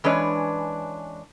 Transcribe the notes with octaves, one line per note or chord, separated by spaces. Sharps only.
E3 G#3 C#4 D4 B4 C#5